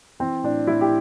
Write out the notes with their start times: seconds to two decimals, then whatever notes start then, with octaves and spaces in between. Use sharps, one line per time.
0.19 E3 C4
0.43 A2 D4
0.67 A2 E4
0.81 G4